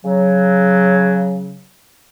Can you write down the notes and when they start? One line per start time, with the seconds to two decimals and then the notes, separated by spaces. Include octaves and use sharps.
0.04 C#3 F#3